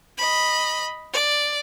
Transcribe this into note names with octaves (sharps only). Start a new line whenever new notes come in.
D#5 B5
D5